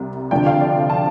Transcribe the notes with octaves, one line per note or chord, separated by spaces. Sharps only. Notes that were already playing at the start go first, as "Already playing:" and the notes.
Already playing: C2 C3 G3
D2 C3 F3 D4 G5
F5
D5
A5